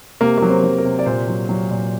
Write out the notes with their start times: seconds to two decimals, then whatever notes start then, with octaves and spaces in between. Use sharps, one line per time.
0.21 C3 A#3
0.38 F#3 A#3
0.49 C4
0.64 F#3
0.78 A#4
0.85 C3
0.99 D5
1.06 A#2 C5
1.28 F#3
1.49 F#3
1.71 A#2